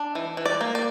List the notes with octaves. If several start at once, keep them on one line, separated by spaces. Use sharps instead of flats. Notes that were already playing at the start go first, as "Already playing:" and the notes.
Already playing: D4
E3
E3
D5
A#3
D5